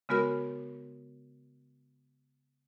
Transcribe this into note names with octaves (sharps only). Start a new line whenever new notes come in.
C#3 G#3 B3 F#4 A#4 F6